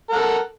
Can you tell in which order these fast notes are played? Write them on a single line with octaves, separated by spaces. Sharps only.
A#4 F#5 A4